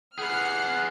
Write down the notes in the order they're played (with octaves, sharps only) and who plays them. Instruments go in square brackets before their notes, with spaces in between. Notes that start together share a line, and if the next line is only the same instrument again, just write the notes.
[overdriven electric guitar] G#4 B4 [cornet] F#5 [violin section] F6 C7